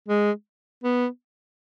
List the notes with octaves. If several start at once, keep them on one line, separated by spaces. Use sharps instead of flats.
G#3
B3